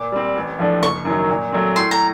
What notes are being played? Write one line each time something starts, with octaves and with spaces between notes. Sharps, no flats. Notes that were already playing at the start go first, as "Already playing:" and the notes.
Already playing: A#2 D6
G3 C4
A1
A2 F3 A3 D4
F#1 C#6
F#2 D#3 F#3
A#2
F#3 A3 C4
A2 C6
A#5